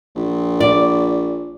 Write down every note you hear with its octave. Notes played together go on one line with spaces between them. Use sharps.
A#1
D5